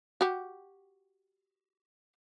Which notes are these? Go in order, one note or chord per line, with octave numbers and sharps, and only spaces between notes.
F#4 G4